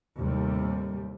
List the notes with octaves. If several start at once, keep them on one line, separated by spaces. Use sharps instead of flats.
D#2 A2 C3 G3